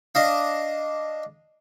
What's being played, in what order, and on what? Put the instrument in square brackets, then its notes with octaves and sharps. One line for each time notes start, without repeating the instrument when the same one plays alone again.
[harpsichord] D4 D#5 F5